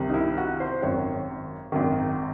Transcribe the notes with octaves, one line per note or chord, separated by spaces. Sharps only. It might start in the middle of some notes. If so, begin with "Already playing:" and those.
Already playing: C2 C3 D#3
D#4
E4
F#4
C5
G#1 F#2 D#3 C#5
G#1 F#2 D#3